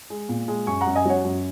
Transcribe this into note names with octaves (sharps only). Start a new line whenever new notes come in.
G#3
A#2
G#3
F#2 G#5 C#6
F#5 A#5
F#2
D#5 G#5
F#3 C#5 F#5
F#2